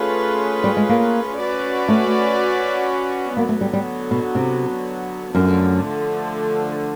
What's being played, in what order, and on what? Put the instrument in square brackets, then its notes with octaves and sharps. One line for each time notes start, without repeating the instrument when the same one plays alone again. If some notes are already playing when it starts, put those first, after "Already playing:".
Already playing: [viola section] A3 C#4 F4 G#4 B4
[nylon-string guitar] G3
G#3
A#3
[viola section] C#4 F#4 B4 D5
[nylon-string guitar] A3
[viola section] D3 F#3 B3 [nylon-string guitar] A#3
[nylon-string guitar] A3
G3
G3
B2
C3
[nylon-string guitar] F#2 [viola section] D3 F3 A3